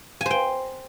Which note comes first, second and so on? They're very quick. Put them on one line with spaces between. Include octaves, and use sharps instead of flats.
G#5 C5 G5